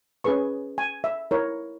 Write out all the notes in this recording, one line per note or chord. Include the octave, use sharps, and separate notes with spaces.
C#4 G#4 B4 C#6
G#5
E5
E4 A#4 C#5